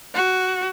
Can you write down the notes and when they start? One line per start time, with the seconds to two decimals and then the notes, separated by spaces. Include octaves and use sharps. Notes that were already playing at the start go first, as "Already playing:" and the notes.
0.14 F#4